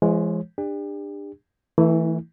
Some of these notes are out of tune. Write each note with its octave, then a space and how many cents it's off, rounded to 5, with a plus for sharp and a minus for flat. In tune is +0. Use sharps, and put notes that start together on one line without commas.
E3 +45 G#3 +0 C#5 -40
D4 +20 G4 +40
E3 -5 A3 +25 E4 -45